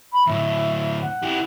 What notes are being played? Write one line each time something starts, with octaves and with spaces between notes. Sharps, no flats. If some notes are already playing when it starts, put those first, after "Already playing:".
B5
D2 A2 E5
F#5
E4 G4